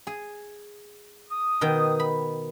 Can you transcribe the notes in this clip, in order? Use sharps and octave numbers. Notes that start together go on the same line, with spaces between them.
G#4
D#6
B2 D#3 G5
B5